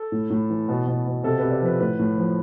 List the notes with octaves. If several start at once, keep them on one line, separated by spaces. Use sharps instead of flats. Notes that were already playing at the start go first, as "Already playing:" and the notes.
Already playing: A4
A2
A2
E3
B2
B2
B2
C3 A4
C3 B4
D5
F3 B4
A2 B4
A2
F3